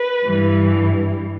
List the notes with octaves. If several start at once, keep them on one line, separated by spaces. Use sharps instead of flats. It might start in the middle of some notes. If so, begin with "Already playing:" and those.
Already playing: B4
G2 E3 G3